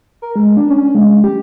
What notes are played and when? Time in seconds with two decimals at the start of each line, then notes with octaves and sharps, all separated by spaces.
0.22 A#4
0.36 G#3
0.57 D4
0.70 C#4
0.95 G#3
1.24 G4